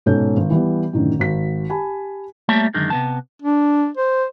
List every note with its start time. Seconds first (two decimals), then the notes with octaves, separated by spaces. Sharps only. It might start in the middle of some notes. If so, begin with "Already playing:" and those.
0.06 G#2 B2 C#4 A4 G6
0.36 G#1
0.50 E3 G3 B3
0.93 F#2 A2 D3 D#3
1.19 G#1 F#4 B6
1.69 G4 G#5 A5 B5
2.49 G3 A3 A#3 C#5 E5 A5
2.74 F#2 D3 D#3 G#3
2.90 C3 B3 A5
3.42 D4
3.97 C5